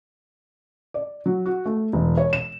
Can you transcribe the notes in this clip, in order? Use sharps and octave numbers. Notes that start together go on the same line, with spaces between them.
D5
F#3
F#4
A3
E1
C#5
E7